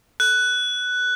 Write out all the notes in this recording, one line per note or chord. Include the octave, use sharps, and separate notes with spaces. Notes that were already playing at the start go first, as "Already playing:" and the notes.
F#6